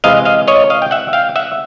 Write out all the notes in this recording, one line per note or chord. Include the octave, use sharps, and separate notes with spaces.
C3 E3 G#3 D#5 F5
D#5 F5
C#5 D#5
D#5 F5
G5
E5 F#5
F5 G5
E5 F#5